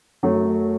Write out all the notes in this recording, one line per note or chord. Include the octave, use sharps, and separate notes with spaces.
F#2 F#3 A3 C#4